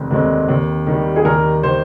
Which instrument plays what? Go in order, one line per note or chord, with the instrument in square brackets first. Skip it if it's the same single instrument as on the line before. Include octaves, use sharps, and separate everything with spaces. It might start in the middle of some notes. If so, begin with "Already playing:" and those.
Already playing: [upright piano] F1 D#2 D3 G#3 C4
D#2 D3 G#3 C4
D#2
D#3 G3
[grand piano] G#4
[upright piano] D#2 [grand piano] A#4
[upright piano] D#3 G3 [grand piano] C5